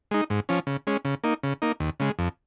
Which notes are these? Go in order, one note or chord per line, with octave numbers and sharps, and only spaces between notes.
G#3 D#4
G#2
F3 C#4
C#3
G#3 C#4
C#3
A#3 D#4
C#3
A#3 D#4
D#2
C#3 G#3
F2